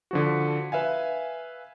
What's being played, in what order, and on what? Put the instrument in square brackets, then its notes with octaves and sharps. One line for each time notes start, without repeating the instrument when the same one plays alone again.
[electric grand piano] D3 F3 F#4
B4 E5 F5 G#5